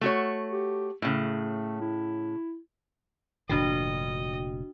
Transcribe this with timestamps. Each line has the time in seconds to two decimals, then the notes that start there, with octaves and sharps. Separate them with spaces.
0.01 A3 F#4 C#5
0.52 G4
1.02 A2 C#3 A3
1.81 E4
3.49 F1 A#2 D3 D4 F#4 D#5 G5